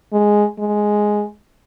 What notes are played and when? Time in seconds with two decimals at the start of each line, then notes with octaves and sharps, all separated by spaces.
0.13 G#3
0.59 G#3